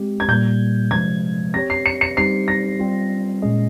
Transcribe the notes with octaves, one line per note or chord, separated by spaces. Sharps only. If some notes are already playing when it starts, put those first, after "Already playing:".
Already playing: G#3 C4 G4
G#6
A#2 G3 A#3 G6
C3 F3 G#3 G#6
C4 G4 C#5 A#6
C7
C#7
C#7
G3 C4 D#4 G4 C5 C7
A#6
G3 C4 F4
A#2 G#3 C#4 G#4 D#5